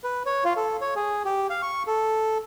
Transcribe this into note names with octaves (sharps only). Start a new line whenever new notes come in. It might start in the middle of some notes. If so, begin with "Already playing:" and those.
B4
C#5
F4
A4
C#5
G#4
G4
F5
C#6
A4